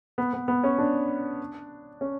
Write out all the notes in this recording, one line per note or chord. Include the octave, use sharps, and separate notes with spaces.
B3
B3
B3
C#4
D4
C#4